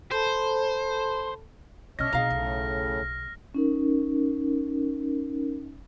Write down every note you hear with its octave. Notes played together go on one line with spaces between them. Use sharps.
A4 C5 A5 B5
B2 C#4 D4 C#5 D#5 E5 F6 A#6
B2 C4 D#4 G#4 F5 A#5
B1 A2 C#3 A3
C#4 D#4 A#4